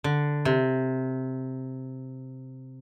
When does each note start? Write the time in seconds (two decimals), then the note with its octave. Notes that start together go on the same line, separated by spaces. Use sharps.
0.04 D3
0.45 C3